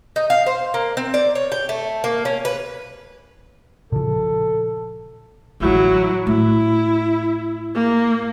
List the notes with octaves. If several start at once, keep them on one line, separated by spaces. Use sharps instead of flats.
D#4
F5
C5
A#3
C4
D5
C#5
G5
A3
A#3
C#4
B4
A#2 C#3 F3 A4
A1 D3 F#3 E4
A2 E4
A#3